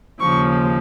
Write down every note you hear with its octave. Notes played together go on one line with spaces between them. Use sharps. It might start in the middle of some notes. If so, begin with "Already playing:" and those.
D#2 C#3 F3 C#6